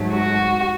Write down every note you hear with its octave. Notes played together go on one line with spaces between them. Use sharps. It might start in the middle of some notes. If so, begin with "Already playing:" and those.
Already playing: G#2 F#3 A3
F#4